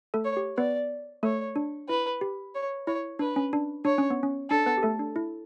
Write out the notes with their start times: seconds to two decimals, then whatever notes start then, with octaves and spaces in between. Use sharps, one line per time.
0.14 A3 A4
0.25 C#5
0.37 G4
0.57 B3 B4 D5
1.23 A3 A4 C#5
1.56 D4
1.89 E4 B4
2.21 G4
2.55 C#5
2.87 E4 C#5
3.19 D4 B4
3.36 C#4
3.53 D4
3.85 D4 C#5
3.98 C#4
4.10 B3
4.23 C#4
4.50 D4 A4
4.66 B3 B4
4.78 G4
4.83 A3 A4
4.99 D4
5.16 E4